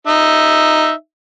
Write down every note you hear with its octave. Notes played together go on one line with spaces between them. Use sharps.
D#4 E5